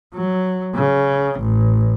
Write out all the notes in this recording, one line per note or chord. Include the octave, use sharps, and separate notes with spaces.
F#3
C#3
A1